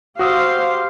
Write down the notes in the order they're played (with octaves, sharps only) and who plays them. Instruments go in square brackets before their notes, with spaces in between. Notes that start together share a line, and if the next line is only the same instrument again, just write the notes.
[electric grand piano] F#4 D#6 E6 [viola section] G4 C5 F5